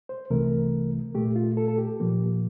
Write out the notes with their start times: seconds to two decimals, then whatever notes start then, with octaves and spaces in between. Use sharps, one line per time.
0.09 C5
0.30 C2 C3 E3 A3 A#4
1.15 A#2 A3 G4
1.36 F4
1.57 A4
1.68 A4
1.78 G4
2.00 A#2 F3 A#3